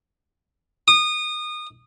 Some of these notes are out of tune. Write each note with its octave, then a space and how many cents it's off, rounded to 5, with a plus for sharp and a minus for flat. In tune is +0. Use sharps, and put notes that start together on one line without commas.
D#6 -25